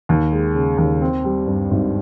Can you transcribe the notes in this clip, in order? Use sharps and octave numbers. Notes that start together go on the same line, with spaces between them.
D#2
G#3
C#3
D#2
C4
G3
G2
G#1